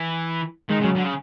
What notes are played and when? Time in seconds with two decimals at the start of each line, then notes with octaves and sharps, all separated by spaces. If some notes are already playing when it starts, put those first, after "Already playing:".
Already playing: E3
0.69 D#3 G#3
0.80 C#3
0.84 F#3
0.95 D3
1.04 C#3